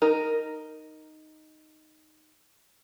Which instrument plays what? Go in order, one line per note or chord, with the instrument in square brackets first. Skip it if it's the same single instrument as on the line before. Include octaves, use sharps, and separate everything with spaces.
[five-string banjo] D#4 A#4